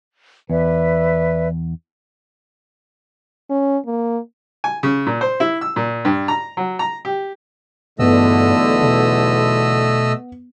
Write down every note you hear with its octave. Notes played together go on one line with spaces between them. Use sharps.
E2 B4 D5 E5
C#4
A#3
G#5
C#3
A#2
C5
E4
E6
A#2
G2
A#5
F#3
A#5
G4
B1 E2 G2 D3 A3 B3 D#5 E6
B2